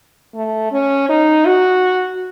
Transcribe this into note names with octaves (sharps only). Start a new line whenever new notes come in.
A3
C#4
D#4
F#4